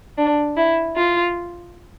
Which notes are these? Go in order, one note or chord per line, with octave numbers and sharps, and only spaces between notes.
D4
E4
F4